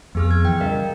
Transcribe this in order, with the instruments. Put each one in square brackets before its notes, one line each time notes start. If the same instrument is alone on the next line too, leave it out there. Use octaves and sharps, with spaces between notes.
[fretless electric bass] F2 [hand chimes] B3 G#4 F6
[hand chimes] G#6
[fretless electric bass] E3 [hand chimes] G5
[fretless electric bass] C#3 G3 [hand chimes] A#4 D#5 F5